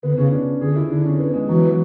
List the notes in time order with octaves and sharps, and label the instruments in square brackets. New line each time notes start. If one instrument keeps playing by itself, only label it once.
[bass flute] D3 [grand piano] B3
[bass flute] C#3 [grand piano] C#4
[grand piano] D4
[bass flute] D3 [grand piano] G#4
[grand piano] E4
[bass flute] D3 [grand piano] D4
[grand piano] C#4
B3
G#3
[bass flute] E3 [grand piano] F#3